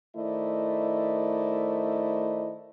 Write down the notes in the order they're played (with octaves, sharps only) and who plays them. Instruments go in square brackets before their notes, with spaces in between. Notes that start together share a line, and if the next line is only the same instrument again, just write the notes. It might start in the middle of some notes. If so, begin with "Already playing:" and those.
[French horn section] D#3 A3 E4 C5 D5 D#5